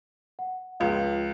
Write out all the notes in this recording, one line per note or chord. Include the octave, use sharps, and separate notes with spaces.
F#5
C#2 F3 F5